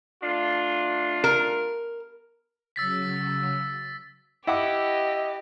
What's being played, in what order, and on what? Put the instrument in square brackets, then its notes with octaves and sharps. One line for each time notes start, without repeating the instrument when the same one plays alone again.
[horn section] A3 D4 F4
[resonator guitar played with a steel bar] A#4
[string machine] C#3 F#3 [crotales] E6 A6 B6
[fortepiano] E4 F#5 D6 [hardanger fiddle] G4 [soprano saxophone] D#5